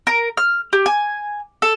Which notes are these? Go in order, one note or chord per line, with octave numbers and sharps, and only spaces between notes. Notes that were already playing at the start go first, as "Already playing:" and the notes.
A#4
F6
G4
G#5
A4